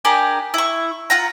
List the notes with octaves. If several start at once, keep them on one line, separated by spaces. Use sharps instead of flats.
D4 G4 G#4 A#4
E4 C#6
F4 F#5 A#5